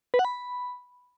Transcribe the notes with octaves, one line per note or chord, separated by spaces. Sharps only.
B4
F#5
B5